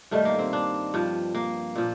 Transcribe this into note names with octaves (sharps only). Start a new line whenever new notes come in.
G2 D#3 G3 A3
A#3
C4
D4
G2 F3
A#3
A#2 F3